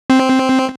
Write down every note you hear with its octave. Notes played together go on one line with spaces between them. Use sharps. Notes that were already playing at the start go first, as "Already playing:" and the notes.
C4